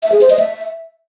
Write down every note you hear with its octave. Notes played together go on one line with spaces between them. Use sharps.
E5
G#4
C5
D#5
E5